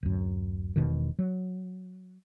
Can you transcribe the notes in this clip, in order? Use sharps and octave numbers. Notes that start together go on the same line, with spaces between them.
D1 F#2
E1 B2 D#3
F#3